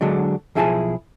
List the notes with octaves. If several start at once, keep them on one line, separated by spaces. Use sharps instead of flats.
D3 F#3 G#3 D4
B1 F3 E4 G#4 G#5 A5